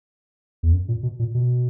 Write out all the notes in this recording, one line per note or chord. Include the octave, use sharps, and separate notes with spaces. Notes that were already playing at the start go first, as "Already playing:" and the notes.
E2
F#2
A#2
B2
A#2
B2